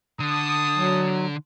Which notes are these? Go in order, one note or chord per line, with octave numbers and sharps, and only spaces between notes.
D3 A5 D#6
F#3